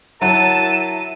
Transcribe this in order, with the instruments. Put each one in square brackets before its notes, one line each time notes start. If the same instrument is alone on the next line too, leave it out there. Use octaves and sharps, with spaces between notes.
[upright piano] F#3 [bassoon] E4 [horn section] A#4 F#5 A5 [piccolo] D#7